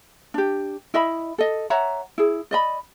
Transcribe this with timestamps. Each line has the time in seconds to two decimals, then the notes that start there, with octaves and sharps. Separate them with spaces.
0.34 D4 G4
0.94 E4 D#5 E5 B5
1.38 A4 D#5
1.70 C#5 E5 F#5 A#5
2.18 E4 G#4
2.51 D5 D#5 B5